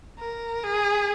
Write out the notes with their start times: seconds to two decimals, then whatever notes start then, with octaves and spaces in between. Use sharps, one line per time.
0.19 A#4
0.64 G#4